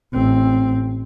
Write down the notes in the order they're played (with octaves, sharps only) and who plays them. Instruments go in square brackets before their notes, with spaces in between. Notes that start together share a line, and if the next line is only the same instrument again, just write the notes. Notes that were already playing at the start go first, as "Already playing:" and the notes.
[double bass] A1 C4